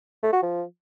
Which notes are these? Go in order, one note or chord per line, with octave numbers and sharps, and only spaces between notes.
A3
F#4
F3